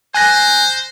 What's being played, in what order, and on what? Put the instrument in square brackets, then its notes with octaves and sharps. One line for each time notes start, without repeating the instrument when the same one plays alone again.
[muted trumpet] C5 [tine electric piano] G#5 F#6 A#6